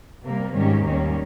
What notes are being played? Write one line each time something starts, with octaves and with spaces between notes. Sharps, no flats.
C3 G3 A#3
G#2 D#3 G3 C#4 G4
D#2 D#3 G3 A#3 C#4